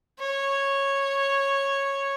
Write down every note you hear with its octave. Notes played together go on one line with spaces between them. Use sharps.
C#5